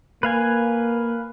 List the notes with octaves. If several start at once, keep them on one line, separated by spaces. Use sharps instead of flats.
A#3 B4 F5 G#5